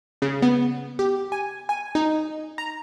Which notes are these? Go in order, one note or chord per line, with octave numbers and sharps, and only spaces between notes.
C#3
B3
G4
G#5
G#5
D#4
A#5